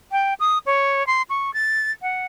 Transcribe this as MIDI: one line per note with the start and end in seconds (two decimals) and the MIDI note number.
0.12 0.34 79
0.40 0.58 87
0.66 1.06 73
1.07 1.22 84
1.30 1.53 85
1.54 1.91 93
2.02 2.26 78